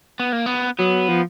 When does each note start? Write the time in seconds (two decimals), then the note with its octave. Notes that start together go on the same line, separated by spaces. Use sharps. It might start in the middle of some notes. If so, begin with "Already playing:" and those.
0.20 B3
0.32 A#3
0.46 B3
0.79 F#3 B3
1.09 F3